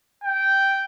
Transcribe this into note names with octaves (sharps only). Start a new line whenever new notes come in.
G5